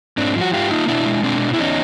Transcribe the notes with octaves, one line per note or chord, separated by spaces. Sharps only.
G#2 C4 D4
F3
F#4
G#2 F4 G4
A#3 D#4 F4
B2 D4 E4
G#3
B2 C4 D4
B3
E4
E2 C#4 D#4